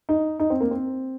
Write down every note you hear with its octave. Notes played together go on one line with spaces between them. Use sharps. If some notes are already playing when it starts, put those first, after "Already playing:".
D#4
D#4
C4
A#3
C4